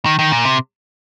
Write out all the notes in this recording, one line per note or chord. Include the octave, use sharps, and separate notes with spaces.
D#3
D#3
A#2
C3